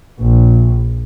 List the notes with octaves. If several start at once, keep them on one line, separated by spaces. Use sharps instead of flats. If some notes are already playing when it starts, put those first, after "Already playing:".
A#1